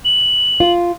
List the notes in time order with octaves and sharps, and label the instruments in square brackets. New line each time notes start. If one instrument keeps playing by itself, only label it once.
[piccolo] F#7
[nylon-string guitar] F4